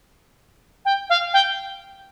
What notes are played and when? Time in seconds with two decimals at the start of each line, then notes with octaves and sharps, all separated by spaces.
0.85 G5
1.10 F5
1.33 G5